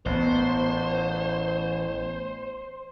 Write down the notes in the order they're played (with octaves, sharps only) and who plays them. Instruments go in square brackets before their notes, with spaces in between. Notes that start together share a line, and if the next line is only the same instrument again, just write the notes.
[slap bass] A1 B3 [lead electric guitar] C5